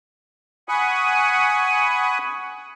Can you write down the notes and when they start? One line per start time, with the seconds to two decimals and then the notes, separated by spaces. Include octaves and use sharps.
0.69 F#5 G#5 B5 C#6 D#6